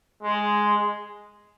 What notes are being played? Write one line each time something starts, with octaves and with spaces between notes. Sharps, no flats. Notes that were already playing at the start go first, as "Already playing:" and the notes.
G#3